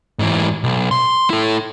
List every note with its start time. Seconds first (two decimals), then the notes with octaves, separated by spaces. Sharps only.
0.19 G#2 E3
0.64 B1
0.91 C6
1.30 E4 A4